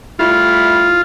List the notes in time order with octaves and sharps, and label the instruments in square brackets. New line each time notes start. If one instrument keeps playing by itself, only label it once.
[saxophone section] G3 A3 E4 [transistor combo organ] F4